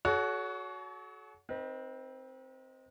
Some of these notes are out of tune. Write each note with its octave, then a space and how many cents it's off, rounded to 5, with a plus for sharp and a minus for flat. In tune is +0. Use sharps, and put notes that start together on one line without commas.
F#4 +0 A4 -45 C#5 +30
C4 +0 D#4 +10 B4 -45